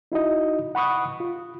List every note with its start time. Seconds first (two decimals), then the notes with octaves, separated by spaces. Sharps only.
0.12 D#4 E4 F#4 D#5
0.75 F#5 B5 C#6 D#6 F#6
1.20 F4